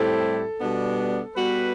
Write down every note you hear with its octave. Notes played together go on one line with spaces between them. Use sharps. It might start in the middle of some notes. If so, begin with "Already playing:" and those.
Already playing: A2 G3 C4 E4 G4 A4
B2 G3 B3 D4
G3 B3 F#4 B4